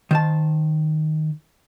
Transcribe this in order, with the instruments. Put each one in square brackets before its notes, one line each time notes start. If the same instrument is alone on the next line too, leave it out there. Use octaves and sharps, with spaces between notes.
[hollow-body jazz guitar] D#3 C5 A5